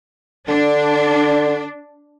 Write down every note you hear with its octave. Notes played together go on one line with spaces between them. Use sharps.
D3 D4